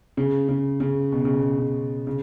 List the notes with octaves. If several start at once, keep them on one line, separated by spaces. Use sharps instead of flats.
C#3
C#3
C#3
B2
C#3
B2
C#3
C#3